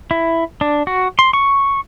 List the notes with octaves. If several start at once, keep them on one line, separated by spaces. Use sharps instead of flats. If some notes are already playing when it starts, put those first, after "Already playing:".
E4
D4
F#4
C6
C#6